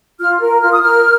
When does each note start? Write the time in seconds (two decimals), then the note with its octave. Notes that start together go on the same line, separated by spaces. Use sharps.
0.20 F4 F6
0.40 A#4
0.62 F4 F6
0.72 D#6
0.82 A#4 F6